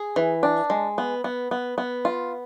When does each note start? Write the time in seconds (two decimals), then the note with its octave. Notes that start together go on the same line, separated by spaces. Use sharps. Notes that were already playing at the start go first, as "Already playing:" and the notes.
Already playing: G#4
0.16 E3
0.43 D4
0.70 G#3
0.98 B3
1.24 B3
1.51 B3
1.78 B3
2.05 F4